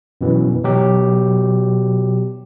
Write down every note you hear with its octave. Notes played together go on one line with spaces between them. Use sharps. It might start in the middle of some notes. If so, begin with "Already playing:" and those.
F#2 B2 E3
B2 F#3 G4